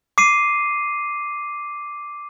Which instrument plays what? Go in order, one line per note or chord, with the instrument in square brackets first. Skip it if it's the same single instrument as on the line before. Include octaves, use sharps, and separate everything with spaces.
[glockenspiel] D6 C7 D#7